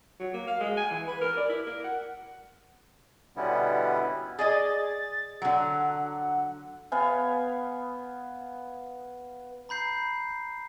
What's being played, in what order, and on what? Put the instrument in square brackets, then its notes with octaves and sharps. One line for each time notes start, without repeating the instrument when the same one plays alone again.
[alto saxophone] F#3
A#3
F5
G#3
G#5
E3
B4
A#4
D5
E4
A#4
F#5
[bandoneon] B2 D3 G3 B3 C#4 E4
[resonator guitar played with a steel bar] G#4 D5 D#5 [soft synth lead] A6
[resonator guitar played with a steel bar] D3 F#3 [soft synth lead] F#5
[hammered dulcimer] B3 F5 G#5
[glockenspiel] A#5 B5 G6 C7